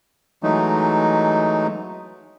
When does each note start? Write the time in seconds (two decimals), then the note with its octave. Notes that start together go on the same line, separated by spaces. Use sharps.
0.43 E3 F#3 G#3 A3 D#4